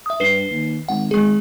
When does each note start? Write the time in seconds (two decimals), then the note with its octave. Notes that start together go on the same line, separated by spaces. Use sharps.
0.06 E5 D#6
0.20 G2 B4 C7 G7
0.51 D#2
0.88 G#1 F#5
1.11 G#1 G#3 G#4